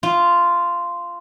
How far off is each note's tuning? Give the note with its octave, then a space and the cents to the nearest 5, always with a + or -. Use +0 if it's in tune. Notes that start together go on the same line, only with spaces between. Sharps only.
F4 -10